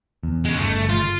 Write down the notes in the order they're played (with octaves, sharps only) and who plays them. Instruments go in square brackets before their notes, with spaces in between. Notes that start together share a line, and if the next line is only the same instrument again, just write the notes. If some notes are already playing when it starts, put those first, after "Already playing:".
[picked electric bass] E2
[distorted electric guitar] C#3 G#3
[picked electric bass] G1 [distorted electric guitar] A3
[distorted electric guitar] F4